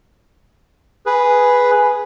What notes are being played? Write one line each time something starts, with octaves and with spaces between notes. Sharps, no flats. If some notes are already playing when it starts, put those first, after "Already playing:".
G#4 B4